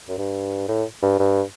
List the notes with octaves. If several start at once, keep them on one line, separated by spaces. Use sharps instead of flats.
F#2
G2
A2
G2
G2